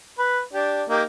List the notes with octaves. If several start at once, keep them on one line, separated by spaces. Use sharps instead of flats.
B4
D4 G4
A#3 D#4 G4